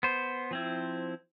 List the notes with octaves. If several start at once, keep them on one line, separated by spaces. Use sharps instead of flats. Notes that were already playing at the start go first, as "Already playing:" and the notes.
B3 C5
F3 C4 E4